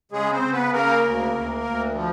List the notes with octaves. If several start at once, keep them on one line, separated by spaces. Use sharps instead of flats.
C#3 G#3 G#4
C4 C5
C#3
B3 B4
C#3 A#3 A#4
D2
D2
D2
F3